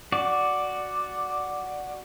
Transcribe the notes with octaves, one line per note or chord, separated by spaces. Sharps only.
F#4 D5